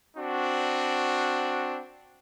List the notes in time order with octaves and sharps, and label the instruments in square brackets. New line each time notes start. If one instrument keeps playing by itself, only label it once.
[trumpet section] C4 D4 F#4